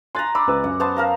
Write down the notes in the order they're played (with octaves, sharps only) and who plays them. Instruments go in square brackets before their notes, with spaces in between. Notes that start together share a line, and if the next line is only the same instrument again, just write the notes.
[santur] G#5 A#5 [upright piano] C6 F#6 A6
[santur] D5 [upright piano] B5 C6 E6
[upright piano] C#2 B4 E6
[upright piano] F#2 [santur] F#5
[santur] B3 C5 A5
A#4 F5 A#5